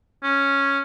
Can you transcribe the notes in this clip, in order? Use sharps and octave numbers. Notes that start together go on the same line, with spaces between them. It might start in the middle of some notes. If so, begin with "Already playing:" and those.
C#4